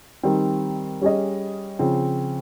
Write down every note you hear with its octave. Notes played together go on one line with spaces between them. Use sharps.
D#3 G3 C4
G3 C#4 G#4 D#5
C#3 F3 C4